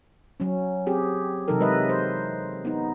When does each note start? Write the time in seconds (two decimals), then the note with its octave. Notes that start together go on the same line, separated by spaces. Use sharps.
0.40 F#3 C#4
0.87 C4 G4 G#4
1.48 C3 E3 F#3 D#4 A4 A#4
1.60 G#3 B4 D#5 E5
1.89 C5
2.65 B3 D#4